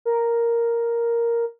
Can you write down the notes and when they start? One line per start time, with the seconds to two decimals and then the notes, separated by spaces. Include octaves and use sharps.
0.05 A#4